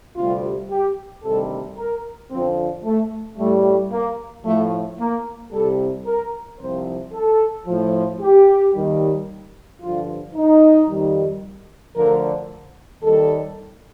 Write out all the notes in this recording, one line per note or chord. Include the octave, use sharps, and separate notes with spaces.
D2 C3 G3 F4
G4
D2 C3 D#3 G3 A4
A#4
F2 D3 F3 C4
A3
A2 G3 A3
A#3
A2 F3 A3
A#3
C2 C3 G3 A4
A#4
C2 C3 F3 C5
A4
A2 F3
G4
D#2 D#3 G3
G2 D3 F3 F4
D#4
F2 D#3 G3
D2 D3 F3 A#4
D#2 D#3 G3 A4